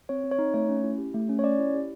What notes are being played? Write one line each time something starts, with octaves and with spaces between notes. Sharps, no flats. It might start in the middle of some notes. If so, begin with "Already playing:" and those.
C4 C#5
C4
C#5
D#4
A3 C#5
C#4
E4
G4
A3
C#4
C#5
C#4 D5
E4
G4